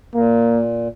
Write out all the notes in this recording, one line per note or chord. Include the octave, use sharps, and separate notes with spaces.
A#2 A#3